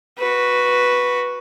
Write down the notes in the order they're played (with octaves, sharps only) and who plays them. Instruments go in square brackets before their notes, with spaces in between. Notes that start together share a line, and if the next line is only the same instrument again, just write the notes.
[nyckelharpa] F#4 B4